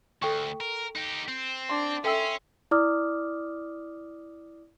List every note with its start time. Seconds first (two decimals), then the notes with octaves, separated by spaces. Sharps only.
0.22 D2 A4 G5 C#6
0.60 A#4
0.95 D#4 G4
1.28 C4
1.69 D4 C6
2.05 C#4 A4 E5 G5 C6 E6
2.71 E4 D5 D6 D#6 F6